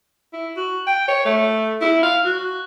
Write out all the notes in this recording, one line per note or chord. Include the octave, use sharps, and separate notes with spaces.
E4
F#4
G5
C#5
A3
E4
F5
F#4